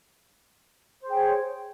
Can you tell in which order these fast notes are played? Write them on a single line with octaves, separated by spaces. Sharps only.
C5 G#4 G5 C#5